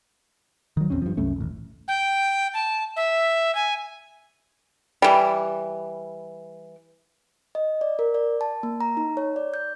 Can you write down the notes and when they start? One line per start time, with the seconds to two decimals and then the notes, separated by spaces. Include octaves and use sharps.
0.77 D#3 F#3
0.90 A#1 E2 C4 C#4
1.02 G2 F3
1.17 C2 F#2 A3 C#4
1.36 D#1 A1
1.88 G5
2.54 A5
2.96 E5
3.55 G#5
5.02 E3 G3
7.55 D#5
7.81 D5
7.99 A#4
8.14 D5
8.41 A5
8.63 A#3
8.81 A#5
8.97 D#4
9.17 C#5
9.36 D5
9.54 G6